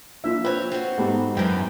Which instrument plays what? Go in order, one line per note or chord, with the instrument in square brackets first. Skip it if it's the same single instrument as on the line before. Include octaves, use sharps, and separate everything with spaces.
[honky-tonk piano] F3 D4 F4 [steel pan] A#3 E5
[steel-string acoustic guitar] C4 C#5 [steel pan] B4
[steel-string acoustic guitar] C4 F#4
[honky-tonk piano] G#2 B3 [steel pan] D#4 G4 A4
[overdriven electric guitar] F#2 [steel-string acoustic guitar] D#3 E3 [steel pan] G5